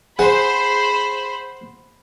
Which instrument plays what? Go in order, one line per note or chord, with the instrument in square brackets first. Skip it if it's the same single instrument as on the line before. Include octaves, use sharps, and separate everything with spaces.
[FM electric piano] G#4 [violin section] C5 [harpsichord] F#5 [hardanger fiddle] B5